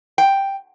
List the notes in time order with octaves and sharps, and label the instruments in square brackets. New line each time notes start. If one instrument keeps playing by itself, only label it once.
[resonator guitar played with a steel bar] G5